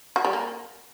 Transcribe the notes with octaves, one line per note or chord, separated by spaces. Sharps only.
F#4
G3
A#3